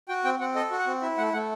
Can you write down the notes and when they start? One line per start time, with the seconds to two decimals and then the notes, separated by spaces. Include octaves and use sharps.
0.09 F#4 G5
0.25 C4 G5
0.40 C4 F#5
0.55 A4 D#5
0.71 F#4
0.78 F#5
0.86 C4
1.02 E4 E5
1.18 A3 F#5
1.33 A3 F#5